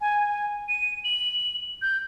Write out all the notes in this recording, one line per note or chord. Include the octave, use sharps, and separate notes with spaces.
G#5
D#7
F#7
G6